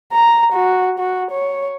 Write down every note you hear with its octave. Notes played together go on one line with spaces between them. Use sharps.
A#5
F#4
F#4
C#5